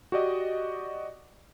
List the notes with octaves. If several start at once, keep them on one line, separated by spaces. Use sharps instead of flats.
F#4 G4 D5 D#5